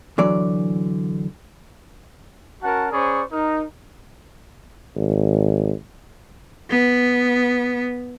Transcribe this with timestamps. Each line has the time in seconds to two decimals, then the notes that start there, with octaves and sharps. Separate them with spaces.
0.18 D3 E3 F#3 D5
2.63 C#4 F#4 A#4 F#5 A5
2.92 C#4 G#4 C5 D5 B5 C#6
3.32 D#4 A#4
4.96 G#1
6.70 B3